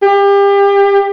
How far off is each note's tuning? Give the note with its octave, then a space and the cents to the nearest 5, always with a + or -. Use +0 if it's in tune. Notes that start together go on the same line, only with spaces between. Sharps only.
G4 +30